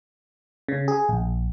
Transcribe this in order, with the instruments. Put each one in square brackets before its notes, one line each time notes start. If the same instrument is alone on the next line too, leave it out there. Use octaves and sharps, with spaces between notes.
[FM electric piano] C#3
G#4
A#1